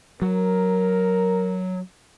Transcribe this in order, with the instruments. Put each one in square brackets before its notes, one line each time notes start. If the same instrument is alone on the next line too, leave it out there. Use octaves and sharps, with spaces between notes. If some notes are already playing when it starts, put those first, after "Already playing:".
[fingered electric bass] F#3 [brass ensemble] A#4